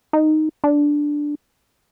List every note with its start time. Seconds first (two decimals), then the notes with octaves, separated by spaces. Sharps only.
0.13 D#4
0.64 D4